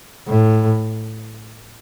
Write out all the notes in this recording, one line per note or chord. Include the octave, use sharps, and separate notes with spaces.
A2